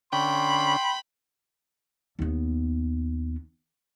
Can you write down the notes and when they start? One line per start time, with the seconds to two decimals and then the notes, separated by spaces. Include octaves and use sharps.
0.13 D3 C#4 G5 B5 C6
2.19 D#2 B3